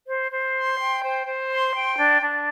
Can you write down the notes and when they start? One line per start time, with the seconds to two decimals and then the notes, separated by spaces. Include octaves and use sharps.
0.08 C5
0.32 C5
0.56 C6
0.80 G5
1.03 C5
1.27 C5
1.50 C6
1.73 G5
1.97 D4
2.21 D4